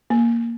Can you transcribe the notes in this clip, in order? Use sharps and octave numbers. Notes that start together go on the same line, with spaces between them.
A#3